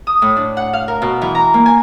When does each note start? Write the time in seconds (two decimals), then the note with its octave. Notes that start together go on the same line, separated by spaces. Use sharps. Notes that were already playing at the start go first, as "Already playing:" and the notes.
0.07 D#6
0.22 A2
0.36 D4
0.57 F#5
0.73 F5
0.88 A#4
1.02 B2
1.21 E3
1.35 A#5
1.54 A#3
1.66 G#5